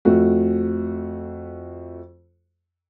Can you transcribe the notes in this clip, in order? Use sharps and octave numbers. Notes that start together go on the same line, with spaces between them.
F2 A3 F#4